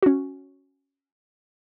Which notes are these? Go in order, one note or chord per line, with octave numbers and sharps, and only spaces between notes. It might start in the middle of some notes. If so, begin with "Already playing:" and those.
C#4 F#4